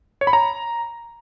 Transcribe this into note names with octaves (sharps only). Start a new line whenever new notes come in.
C#5
B5
A#5